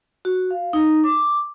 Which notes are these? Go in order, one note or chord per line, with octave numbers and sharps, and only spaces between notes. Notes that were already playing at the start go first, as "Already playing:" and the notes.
F#4
F5
D#4
D6